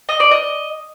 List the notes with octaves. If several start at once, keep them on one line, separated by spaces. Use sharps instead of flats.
D#5
D5
D#5